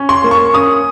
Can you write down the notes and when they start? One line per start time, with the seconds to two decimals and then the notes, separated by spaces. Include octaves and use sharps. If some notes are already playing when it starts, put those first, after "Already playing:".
Already playing: C#4
0.09 C6
0.24 A#3
0.31 C#6
0.54 C#4 D#6